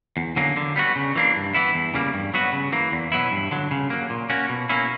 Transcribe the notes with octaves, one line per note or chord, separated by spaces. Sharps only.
E2
D3 F#3 A#3 C#4
D3
G3 B3 F#4
C#3
E3 A#3 D4
G2
E3 B3 E4
E2
C#3 G3 A#3
G2
F#3 B3 F#4
C#3
E3 A#3
E2
B2 F#3 B3 E4
G2
D3 F#3
C#3
F#3 A#3
A#2
A#3 C#4 F#4
B2
A#3 C#4 E4